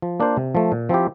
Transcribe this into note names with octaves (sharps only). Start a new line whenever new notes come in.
F3
A#3 D4 F4 C5
C3
F3 A3
A#2
F3 C4 E4 G4